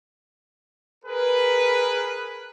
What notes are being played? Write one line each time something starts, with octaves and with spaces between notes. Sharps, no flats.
G#4 A#4 B4